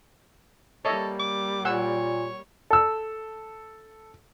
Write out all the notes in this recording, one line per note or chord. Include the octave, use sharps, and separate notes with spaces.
G3 A#3 A4 C#5 D#5 E5
D6
A#2 C#5 F#5 G#5 E6
A4 E6